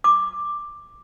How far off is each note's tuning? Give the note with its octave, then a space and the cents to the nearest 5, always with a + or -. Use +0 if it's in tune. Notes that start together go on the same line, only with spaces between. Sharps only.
D6 +5